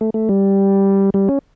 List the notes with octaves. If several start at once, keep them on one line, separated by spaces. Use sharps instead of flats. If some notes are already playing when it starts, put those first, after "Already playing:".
A3
A3
G3
G3
C#4